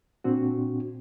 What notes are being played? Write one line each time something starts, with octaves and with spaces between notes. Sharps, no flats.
A#2 C4 D4 F#4